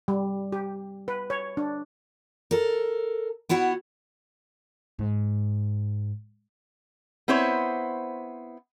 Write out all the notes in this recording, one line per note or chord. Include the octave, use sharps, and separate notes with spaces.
G3
G4
B4
C#5
D4
A4 A#4
B3 E4 F#4 F#5
G#2
B3 C4 E4 C5 C#5